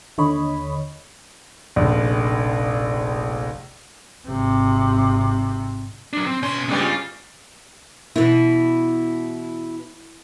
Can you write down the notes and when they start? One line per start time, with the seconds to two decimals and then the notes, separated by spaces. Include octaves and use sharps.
0.18 D#2 D3 C#5 D#5 B5
1.76 F1 A#1
4.28 G#1 C3
6.13 F#3 D4
6.27 C4
6.43 B2 C#4 C6
6.69 G2 C#3 G3 G#3 B3
6.81 F4
8.16 B2 E3 E4